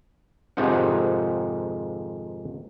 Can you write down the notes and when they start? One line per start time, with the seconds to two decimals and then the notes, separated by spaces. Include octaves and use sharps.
0.57 F2 G#2 C3 D#3 F3 F#5